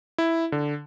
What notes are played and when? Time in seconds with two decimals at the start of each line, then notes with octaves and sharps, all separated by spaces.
0.18 E4
0.52 D3